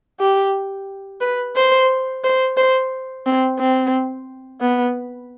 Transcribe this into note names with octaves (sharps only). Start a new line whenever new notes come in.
G4
B4
C5
C5
C5
C4
C4
B3